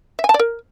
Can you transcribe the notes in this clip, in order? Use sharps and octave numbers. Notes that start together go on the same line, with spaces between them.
E5
G#5
A5
D5
A#4